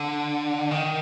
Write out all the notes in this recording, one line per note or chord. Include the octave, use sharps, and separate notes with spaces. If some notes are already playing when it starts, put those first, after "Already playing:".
Already playing: D3
D#3